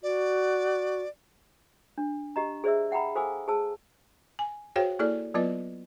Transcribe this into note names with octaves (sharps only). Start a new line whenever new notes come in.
F#4 D5
D4
G4 D#5 A#5
G#4 C5 D5 E5 E6
E5 F#5 G5 A#5 B5
A4 C5 F5 G#5 D6 E6
G#4 C5 A5 E6
G#5
F#4 G#4 C5 C#5 F5 G5
A#3 E4 G#4 A4 D5
F#3 B3 F4 B4 D#5